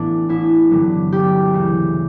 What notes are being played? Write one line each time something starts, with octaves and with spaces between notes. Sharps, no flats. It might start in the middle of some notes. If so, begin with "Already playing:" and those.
Already playing: A1 A2 E3 B3 D4
A1 E4
G2 D3 F#3
E1 G4
D2 C#3 E3